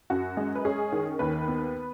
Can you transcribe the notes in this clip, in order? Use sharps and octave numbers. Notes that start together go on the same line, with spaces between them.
F#2 F#4
G#3
B4
C#4 G#4
D#3
D#2 B4
B3